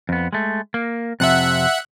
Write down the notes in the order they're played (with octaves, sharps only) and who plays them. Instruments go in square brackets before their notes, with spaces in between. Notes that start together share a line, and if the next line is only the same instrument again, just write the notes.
[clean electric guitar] F2 B3
G#3 A3
A#3
[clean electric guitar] F2 C3 F3 [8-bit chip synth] E5 F#5 F#6